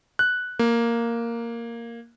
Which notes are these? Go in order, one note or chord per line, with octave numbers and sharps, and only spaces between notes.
F#6
A#3